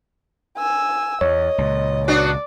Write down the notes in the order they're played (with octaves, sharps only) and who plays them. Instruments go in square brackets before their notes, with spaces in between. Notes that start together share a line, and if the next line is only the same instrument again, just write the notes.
[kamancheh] G#5 E6
[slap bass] E2 [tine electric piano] C#5 [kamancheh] D#5
[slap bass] C#2 A#2
[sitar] B3 D4 F#4 [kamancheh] D5